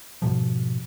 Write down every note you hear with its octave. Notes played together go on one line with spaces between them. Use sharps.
G#2 B2 F3